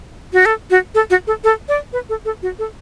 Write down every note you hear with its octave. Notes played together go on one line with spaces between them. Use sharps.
F#4
A4
F#4
A4
F#4
A4
A4
D5
B4
A4
A4
F#4
A4